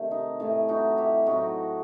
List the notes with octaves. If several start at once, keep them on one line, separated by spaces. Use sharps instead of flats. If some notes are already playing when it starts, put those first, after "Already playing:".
Already playing: C3 D#3 A3
D#4
A2 E3 A3 E4
D#4 F#4
E4 G4
A2 F#3 C4 D#4 F#4